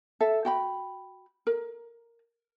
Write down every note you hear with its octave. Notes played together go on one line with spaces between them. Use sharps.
A4 E5
F#4 G5 B5
A#4